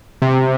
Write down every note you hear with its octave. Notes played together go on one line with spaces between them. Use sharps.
C3